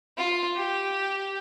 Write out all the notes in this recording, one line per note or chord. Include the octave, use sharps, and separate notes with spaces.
F4
G4